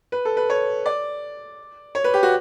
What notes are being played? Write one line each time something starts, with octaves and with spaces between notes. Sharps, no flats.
B4
A4
B4
C#5
D5
C#5
B4
G4
F#4